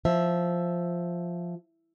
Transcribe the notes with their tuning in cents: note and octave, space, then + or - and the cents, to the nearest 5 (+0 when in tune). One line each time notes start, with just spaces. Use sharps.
F3 +0 E5 +0